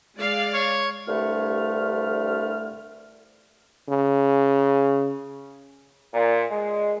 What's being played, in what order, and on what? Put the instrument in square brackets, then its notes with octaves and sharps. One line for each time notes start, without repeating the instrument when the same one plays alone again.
[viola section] G#3 D5 F5
[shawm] C#5
[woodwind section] C2 G2 D3 A3 F6
[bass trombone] C#3
[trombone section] A#2
G#3